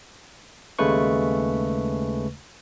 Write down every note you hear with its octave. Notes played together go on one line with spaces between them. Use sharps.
D#2 C#3 G#3 A3 B4 C#6